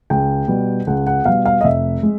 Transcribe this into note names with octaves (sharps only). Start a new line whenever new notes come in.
C#2 G5
B2 G3
C#2 F#5
F#5
B2 G3 F5
F5
D#5
F1 E5
G#3